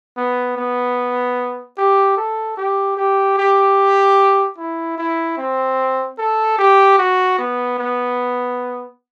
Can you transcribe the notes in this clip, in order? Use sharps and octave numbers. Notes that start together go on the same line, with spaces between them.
B3
B3
G4
A4
G4
G4
G4
E4
E4
C4
A4
G4
F#4
B3
B3